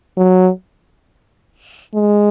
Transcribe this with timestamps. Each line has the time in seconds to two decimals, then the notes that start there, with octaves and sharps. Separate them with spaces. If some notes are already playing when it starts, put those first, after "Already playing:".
0.17 F#3
1.95 G#3